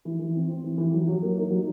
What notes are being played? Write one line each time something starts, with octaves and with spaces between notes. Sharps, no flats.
E3
E3
C4
C4
E3
E3
F#3
F#3
A#3
D#4
F#3